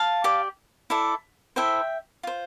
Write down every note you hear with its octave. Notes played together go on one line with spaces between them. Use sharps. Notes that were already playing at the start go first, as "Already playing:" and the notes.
Already playing: F5 A5
G4 D5
E4 A4 D5
E4 A4 C5 E5 G5
F4 C5